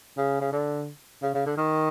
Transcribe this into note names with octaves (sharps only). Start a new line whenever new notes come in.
C#3
C#3
D3
C#3
C#3
D3
D#3